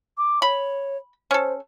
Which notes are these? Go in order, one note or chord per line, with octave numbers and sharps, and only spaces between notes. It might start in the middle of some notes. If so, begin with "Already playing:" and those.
D6
C#5 B5
C#4 A4 C5